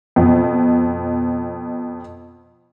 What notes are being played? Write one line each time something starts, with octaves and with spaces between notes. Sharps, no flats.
F2 B2